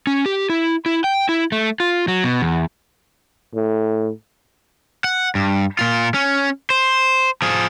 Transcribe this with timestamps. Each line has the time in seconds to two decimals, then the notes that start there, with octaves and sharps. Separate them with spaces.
0.07 C#4
0.26 G4
0.50 E4
0.86 E4
1.04 G5
1.29 E4
1.52 A3
1.80 F4
2.08 F#3
2.24 B2
2.42 E2
3.55 A2
5.04 F#5
5.35 G2
5.79 A#2 F4
6.14 C#4
6.70 C5
7.42 F3 G#4